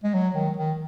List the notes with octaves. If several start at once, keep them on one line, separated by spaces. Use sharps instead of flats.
G#3
F#3
D#3
D#3